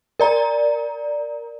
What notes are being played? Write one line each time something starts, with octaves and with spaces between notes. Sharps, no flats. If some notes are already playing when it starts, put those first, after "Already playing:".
A#4 D5 A#5